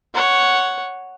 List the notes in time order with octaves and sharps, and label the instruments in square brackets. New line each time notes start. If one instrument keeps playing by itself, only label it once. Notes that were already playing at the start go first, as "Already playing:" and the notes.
[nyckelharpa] C#5 F#5